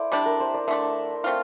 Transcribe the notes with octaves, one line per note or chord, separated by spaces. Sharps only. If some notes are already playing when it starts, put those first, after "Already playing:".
Already playing: E4 A4 C5 D5
C3 G3 D4 E5
A#4
C5
D5
D3 A3 D4 E5
A3 C4 F4